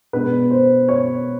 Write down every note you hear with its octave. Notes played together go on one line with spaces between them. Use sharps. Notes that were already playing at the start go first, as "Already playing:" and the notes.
B2 G#3 B3 D4 B4
C5
C#5